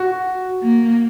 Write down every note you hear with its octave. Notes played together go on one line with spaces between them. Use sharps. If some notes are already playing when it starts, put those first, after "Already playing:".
Already playing: F#4
A#3